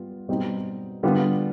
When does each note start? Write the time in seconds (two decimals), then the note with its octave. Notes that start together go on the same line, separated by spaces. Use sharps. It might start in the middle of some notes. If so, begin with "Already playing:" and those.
Already playing: G3 B3 F4
0.28 B2 G3 C4 D#4
1.03 D3 G3 B3 F4